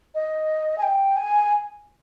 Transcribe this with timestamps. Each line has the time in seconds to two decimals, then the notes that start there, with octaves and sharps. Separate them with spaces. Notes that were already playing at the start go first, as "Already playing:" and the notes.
0.15 D#5
0.78 G#5
0.83 G5
1.16 G#5